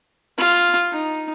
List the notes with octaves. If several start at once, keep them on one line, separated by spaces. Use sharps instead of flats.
F4
D#4